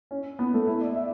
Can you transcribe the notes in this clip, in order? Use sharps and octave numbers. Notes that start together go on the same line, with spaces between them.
C#4
B3
A3
E4
D5
E5